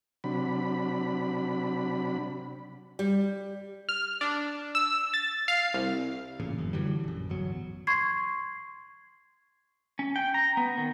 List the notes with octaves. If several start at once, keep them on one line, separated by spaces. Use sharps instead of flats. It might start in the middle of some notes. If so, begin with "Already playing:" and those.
C3 F#3 D4 B5
G3
F6
D4
E6
A6
F5
C2
A1 E2 A#2 C#3
G1 F#2
D3 E3 F#3 G3
A#1 F#2
D1 G1 E2 F#3
C6 C#6 G#6 C7
C#4
G5
A#5
B3
D#3